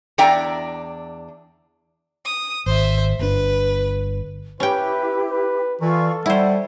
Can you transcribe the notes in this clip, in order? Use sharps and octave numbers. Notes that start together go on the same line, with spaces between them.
E2 D4 E5 G5 A#5
D#6
G#1 C5 E5
G1 B2 D4 B4
C#4 E4 G4 B4 G5
B4
E3 F4 A4 D5 C#6
G3 E4 C5 F#5